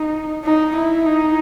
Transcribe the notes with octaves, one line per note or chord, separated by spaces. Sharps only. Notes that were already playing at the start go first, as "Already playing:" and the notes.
Already playing: D#4
D#4
E4
D#4